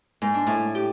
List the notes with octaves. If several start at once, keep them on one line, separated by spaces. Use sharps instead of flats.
G#2
D4
A2
G4